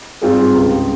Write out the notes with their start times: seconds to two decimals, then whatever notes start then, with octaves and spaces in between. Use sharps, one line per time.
0.21 G#2 G3 C4 F4 G#4
0.55 C#2 C#3 G#3